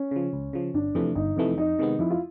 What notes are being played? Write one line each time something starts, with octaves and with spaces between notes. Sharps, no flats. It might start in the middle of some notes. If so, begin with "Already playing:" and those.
Already playing: C#4
C#3 F3
C#2
C#3 F3
G1 D4
F2 C3 E3 A3
G1 D#4
F2 C3 E3 A3
F2 D#4
C3 D#3 G#3 B3
F2 E4
F4